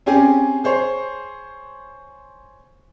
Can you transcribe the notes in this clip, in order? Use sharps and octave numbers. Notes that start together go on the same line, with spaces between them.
C4 C#4 G4 G#4 G#5
G#4 C5 C#5